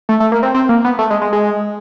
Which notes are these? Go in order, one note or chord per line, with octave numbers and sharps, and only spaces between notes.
A3
A3
A#3
C4
C4
A#3
B3
A3
G#3
G#3
G#3